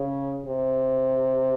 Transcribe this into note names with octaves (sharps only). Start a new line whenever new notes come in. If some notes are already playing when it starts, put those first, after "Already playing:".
Already playing: C#3
C3